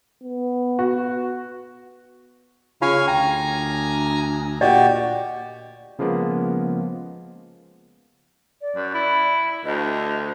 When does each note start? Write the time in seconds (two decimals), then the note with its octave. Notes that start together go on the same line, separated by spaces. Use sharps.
0.24 B3
0.79 F#4
2.82 C#3 F4 C#5 F5 G#5
3.08 D2 G5 G#5 A#5
4.61 A#2 F#4 G4 D5 D#5
5.99 C#3 F3 G#3 A#3 B3
8.62 D5
8.76 F#2
8.94 E4
9.65 D2 D#5